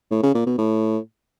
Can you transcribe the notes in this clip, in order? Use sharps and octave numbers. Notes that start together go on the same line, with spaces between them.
A2
C#3
A#2
B2
A2